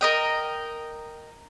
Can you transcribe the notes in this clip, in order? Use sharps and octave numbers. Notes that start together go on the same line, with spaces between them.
A#4 D#5 G5